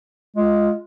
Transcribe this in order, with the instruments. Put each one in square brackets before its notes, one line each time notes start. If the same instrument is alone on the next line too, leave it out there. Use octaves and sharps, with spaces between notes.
[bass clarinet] G#3 [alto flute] F4